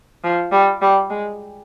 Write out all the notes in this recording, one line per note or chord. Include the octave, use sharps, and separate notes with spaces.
F3
G3
G3
G#3